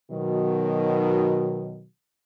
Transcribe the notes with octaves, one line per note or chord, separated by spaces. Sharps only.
B2 D#3 F#3